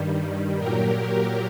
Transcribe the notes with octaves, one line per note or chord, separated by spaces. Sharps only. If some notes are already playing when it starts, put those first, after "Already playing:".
Already playing: G2 D#3 G3
A#2 F#3 G4 A#4
G4 A#4